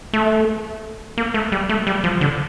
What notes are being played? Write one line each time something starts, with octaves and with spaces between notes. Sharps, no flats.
A3
A#3
A3
G3
A3
G3
F3
D3